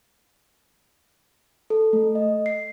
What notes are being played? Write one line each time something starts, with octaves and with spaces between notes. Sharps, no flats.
A4
A3
D#5
C7